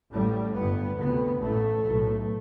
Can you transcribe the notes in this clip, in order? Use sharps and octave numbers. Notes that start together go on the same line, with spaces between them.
A1 A2 G3
G1 G2 B3
D2 C3 B3
A1 A2 A3
B1 A2